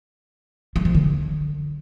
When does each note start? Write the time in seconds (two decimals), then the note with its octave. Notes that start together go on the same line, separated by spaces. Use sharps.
0.76 F#3
0.85 F3
0.95 D3